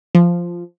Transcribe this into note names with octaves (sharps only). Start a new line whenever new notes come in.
F3